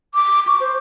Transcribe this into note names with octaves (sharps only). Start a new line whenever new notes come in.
D6
C#6
C5